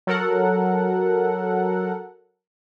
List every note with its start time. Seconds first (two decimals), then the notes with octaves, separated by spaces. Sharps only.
0.07 F#3 A4 A#4 F#5